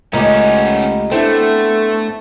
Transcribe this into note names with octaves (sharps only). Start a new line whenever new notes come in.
C#2 A3 B3 C#4 D#4 G4
A3 B3 C4 D4 E4 A4 C5